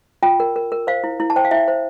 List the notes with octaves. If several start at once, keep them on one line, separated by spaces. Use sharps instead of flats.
F4 G5
A#4
A#4
A#4
C5 F5
E4
E4
A5
C5 G5
F5
E4 E5
C5